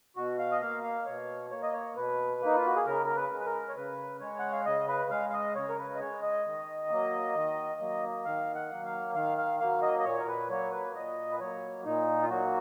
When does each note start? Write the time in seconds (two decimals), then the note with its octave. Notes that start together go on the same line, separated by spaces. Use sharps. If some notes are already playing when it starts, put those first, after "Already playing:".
0.16 B2 F#4
0.39 F5
0.52 D#5
0.61 A#3 F5
0.83 F5
1.06 B2 C#5
1.51 A#3 C#5
1.63 D#5
1.73 C#5
1.96 B2 B4
2.41 A#3
2.46 D#4
2.56 F4
2.66 F#4
2.76 G#4
2.86 C#3 A#4
3.06 A#4
3.16 B4
3.31 G#3
3.40 B4
3.46 A#4
3.69 C#5
3.76 C#3 B4
4.21 G#3 C#5
4.39 F#5
4.52 F5
4.65 C#3 D#5
4.88 B4
5.11 G#3 F5
5.29 F5
5.33 D#5
5.56 C#3 C#5
5.69 A#4
5.78 B4
5.95 D#5
6.00 G#3 C#5
6.22 D#5
6.46 D#3
6.90 F#3 A#3
7.35 D#3
7.80 F#3 A#3
8.25 D#3 F5
8.55 F#5
8.70 F#3 A#3
8.85 F5
9.15 D#3 F5
9.38 F5
9.60 F#3 A#3 F5
9.82 D#5
9.99 D#5
10.05 A#2 C#5
10.20 A#4
10.28 B4
10.49 F#3 A#3 C#5
10.72 B4
10.95 A#2 D#5
11.31 B4
11.39 F#3 A#3 C#5
11.85 A#2 D#4
12.22 F4
12.29 F#3 A#3 F#4